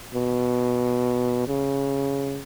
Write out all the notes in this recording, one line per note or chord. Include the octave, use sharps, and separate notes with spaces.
B2
C#3